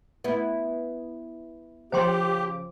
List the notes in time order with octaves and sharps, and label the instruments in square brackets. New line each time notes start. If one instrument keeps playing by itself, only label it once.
[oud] B3 E4
[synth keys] C#3 F3 D6 [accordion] G4 [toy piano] C5 G5 C6